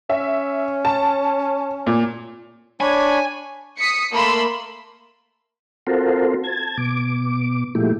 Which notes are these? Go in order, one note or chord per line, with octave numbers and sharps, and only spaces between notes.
C#4 E5
A5
A#2
D4 C#5 G#5 B5
D#6 B6 C#7
A3 A#3 B5 C6 E6
C4 F4 F#4 A4 A#4 C5
A5 G#6
B2 D6
A#2 F3 G#3 A3 E4 G4